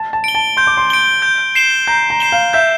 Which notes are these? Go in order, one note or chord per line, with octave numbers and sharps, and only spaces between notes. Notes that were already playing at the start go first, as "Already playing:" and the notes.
Already playing: A5
A5
D7 G7
A5
C6 G6
D6
C6
D7 G7
G6
C7 E7 G7
A#5 G6
A#5
C7 E7 G7
F5
E5 G6